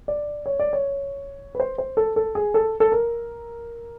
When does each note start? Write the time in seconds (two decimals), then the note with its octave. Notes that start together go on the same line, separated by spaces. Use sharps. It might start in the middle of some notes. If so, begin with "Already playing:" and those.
0.08 D5
0.46 C#5
0.59 D5
0.73 C#5
1.55 B4
1.60 C5
1.78 C5
1.97 A4
2.16 A4
2.35 G#4
2.54 A4
2.80 A4
2.92 A#4